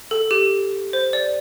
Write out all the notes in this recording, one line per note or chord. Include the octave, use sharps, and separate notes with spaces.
A4
G4
C5
D5